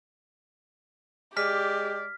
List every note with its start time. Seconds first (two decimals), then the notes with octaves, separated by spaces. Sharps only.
1.37 G#3 G4 D5 F6 B6